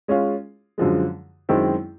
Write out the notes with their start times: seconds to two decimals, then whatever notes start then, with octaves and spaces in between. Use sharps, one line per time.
0.08 G#3 C#4 F4
0.78 F#2 D3 F3 G#3
1.49 F#2 D#3 G#3 C4 E4